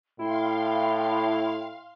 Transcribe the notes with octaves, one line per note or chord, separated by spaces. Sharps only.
A2 E4 F5 G5 C6